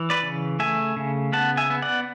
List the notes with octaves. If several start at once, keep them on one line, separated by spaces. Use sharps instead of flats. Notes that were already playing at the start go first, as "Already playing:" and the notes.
Already playing: E3
B4 D5
C#3
A3 E5 G#5
C#3
B3 F#5 A5
E5 G#5
B3
D5 F#5